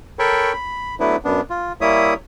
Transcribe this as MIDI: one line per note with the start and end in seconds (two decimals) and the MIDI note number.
0.19 0.53 69
0.19 0.53 70
0.19 0.53 73
0.19 0.53 79
0.19 0.53 83
0.19 0.53 85
0.53 0.95 83
1.00 1.16 54
1.00 1.16 57
1.00 1.16 59
1.00 1.16 62
1.00 1.16 64
1.00 1.16 71
1.25 1.41 42
1.25 1.41 59
1.25 1.41 62
1.50 1.73 65
1.81 2.14 55
1.81 2.14 58
1.81 2.14 64
1.81 2.14 73
1.81 2.14 76
1.81 2.14 87